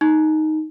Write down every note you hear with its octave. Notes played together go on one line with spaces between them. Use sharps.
D#4